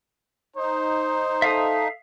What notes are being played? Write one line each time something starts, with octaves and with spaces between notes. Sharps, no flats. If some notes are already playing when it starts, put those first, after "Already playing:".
D#4 C5
A4 E5 F5 D#6